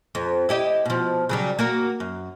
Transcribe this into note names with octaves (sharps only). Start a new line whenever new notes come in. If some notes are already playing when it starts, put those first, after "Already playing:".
F2
E4 G4 D#5
B2 F3
C#3 F#3 G3
A#3 F#4 A#4
F#2